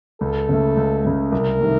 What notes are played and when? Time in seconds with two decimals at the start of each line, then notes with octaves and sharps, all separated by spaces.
0.21 C#2 A4
0.49 C#3 A3
0.77 C#2
1.04 C#3 A3
1.32 C2 A#4
1.60 C3 D#3 A3